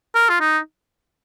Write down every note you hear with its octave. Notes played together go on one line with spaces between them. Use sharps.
A#4
F4
D#4